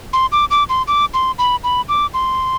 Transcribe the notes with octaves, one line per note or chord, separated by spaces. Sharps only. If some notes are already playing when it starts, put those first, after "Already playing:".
C6
D6
D6
C6
D6
C6
B5
B5
D6
C6